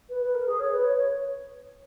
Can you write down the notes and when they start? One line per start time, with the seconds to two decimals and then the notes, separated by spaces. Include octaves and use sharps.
0.09 B4
0.22 B4
0.34 A#4
0.46 G#4
0.59 C#5
0.71 B4
0.83 C#5
0.96 C#5